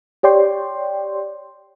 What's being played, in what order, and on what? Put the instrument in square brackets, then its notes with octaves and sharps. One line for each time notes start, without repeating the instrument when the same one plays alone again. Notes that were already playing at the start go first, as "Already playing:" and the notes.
[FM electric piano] G4 C#5 D5 G5 C6